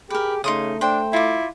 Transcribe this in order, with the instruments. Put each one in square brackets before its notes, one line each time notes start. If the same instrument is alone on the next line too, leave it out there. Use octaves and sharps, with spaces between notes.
[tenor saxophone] G4 [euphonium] G#4 [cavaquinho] A#4 B4
[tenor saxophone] C#3 [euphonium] A3 [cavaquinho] D#4 C6 D#6
[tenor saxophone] D4 [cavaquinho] C5 G5
[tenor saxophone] E4 [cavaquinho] F4 D6